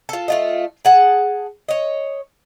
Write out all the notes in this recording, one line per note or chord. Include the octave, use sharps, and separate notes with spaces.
F4 A4
A3 F4 D#5
G#4 F#5 A5
C#5 D#5